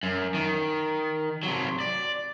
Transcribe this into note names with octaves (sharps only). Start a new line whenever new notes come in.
F#2
D#3
C3 F#3
D5